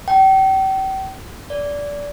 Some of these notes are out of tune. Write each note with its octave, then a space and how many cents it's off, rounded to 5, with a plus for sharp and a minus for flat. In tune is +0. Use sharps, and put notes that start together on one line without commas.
G5 -35
D5 -20